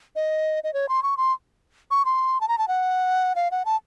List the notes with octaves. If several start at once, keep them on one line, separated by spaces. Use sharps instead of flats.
D#5
D#5
C#5
C6
C#6
C6
C#6
C6
A5
A#5
A5
F#5
F5
F#5
A5